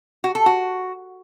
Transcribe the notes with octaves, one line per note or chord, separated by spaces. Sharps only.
F#4
A4
F#4